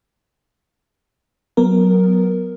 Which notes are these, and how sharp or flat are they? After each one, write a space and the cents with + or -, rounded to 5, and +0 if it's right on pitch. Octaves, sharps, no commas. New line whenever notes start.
F#3 +0 B3 +0 A#4 +0